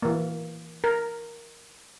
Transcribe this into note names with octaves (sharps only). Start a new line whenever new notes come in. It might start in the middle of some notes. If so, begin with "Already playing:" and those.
E3 A#3
A#4